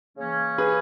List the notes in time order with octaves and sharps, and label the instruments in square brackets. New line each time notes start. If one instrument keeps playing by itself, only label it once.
[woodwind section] C#3 E3 A#3 C#4
[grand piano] G#4 B4